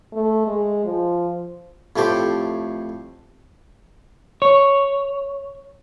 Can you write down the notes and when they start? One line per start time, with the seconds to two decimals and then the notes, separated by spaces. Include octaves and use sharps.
0.13 A3
0.47 G#3
0.85 F3
1.96 F2 A2 A3 G4 C5
4.42 C#5